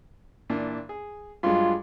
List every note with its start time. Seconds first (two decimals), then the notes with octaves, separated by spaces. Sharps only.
0.50 A#2 E3 D4
0.89 G#4
1.43 G2 F#3 G#3 F4